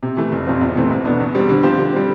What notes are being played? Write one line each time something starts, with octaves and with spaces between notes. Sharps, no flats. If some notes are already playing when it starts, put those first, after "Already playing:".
C3
E3 A3
F1
F2 C3 F3 C4
E2
C3 E3 A3 C4
C2
B2 B3 D4
E2
B2 G3 C4
D3
F3 C4 G4 C5
D3
G3 C4